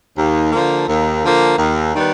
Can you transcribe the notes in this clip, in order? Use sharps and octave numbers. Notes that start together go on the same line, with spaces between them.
D#2
D3 F3 A#3
D#2
D3 F3 A#3
D#2
D#3 G3 B3